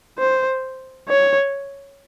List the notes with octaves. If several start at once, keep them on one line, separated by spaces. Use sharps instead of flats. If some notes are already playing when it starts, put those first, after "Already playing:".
C5
C#5